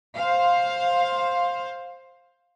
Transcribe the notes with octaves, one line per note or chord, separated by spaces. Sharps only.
C5 F5